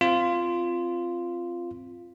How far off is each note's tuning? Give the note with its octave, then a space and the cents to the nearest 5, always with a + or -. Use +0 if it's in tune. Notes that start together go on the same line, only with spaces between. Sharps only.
C4 +0 F4 -10